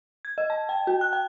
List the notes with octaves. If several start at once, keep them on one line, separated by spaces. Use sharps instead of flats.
G#6
D#5
A5
G5
F#4
F#6
G5